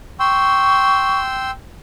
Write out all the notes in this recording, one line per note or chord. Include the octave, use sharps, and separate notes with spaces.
G5 C6 C#6 E6